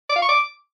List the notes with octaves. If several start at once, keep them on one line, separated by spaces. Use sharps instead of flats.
D6
F5
C#6
D6